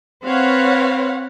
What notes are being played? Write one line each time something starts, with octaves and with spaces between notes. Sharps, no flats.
C4 B4 C#5 F5 F#5